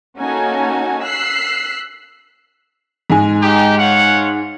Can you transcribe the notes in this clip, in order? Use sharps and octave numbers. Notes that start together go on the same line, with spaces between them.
A#3 C#4 D#4 F#4 A4 G#5
E6 F#6 B6 C7
G#2 G#3 G#5
D#4 G4
F4 C#5 F#5